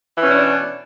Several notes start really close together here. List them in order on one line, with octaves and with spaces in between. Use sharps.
E3 C#4 B2 D4